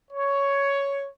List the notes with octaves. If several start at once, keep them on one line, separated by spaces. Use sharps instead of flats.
C#5